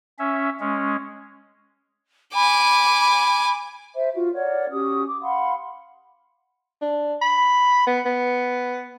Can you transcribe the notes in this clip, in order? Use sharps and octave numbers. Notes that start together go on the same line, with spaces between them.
C#4 E5
G#3 C#4
G#5 B5 D6
C5 E5
F4 F#4
A#4 C#5 D5 F#5
C#4 F#4 G4 D#6
D6
F5 F#5 B5 C6
D4
B5
B3
B3